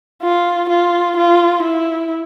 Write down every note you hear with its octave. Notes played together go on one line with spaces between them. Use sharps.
F4
F4
F4
E4